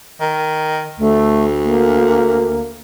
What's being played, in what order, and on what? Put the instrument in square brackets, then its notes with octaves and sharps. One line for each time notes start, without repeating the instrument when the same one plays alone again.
[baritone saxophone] D#3
[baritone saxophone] D2 [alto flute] A3
[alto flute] A#3